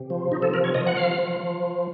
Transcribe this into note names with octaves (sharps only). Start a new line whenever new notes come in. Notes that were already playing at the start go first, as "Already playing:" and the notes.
Already playing: C3
F3
C3 D#4
A4
F3 A#4
C#5
F3 D#5
F#5
F3 F5
F3
F3